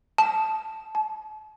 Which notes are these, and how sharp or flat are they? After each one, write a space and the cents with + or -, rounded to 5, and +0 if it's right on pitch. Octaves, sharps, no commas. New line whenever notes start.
A5 -10
A5 -35